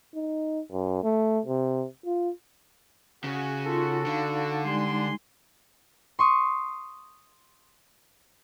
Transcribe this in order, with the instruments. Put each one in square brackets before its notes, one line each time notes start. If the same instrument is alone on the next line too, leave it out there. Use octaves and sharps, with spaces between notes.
[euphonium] D#4
F#2
A3
C3
F4
[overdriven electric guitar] C#3 [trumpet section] F#4 [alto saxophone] G#5
[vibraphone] D#4 F4 C6 [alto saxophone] A4
[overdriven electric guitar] D3 [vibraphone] D#4 F5
[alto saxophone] G3 [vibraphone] G#3 D#4 [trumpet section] G#5 C6
[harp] C6 C#6 D#6